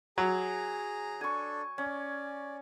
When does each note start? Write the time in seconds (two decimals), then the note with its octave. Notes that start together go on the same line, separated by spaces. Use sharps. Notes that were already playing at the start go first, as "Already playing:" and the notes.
0.18 F#3 G#4 A#5
1.21 D4 A4 G#5 C#6
1.78 C#4 D5